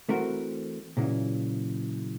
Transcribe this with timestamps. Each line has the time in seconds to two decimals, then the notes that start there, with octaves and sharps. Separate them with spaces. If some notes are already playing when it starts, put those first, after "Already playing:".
0.09 E3 A3 C4 F#4 A#4
0.97 A#2 C#3 E3 F#3